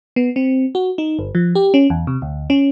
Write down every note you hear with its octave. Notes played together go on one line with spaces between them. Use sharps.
B3
C4
F#4
D#4
G1
F3
G4
C#4
E2
C3
D2
C#4